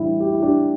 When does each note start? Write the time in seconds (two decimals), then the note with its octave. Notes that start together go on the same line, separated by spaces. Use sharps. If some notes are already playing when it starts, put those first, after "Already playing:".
Already playing: A2 E3 G3 D4 E4
0.20 G4
0.32 E4
0.42 D4 G4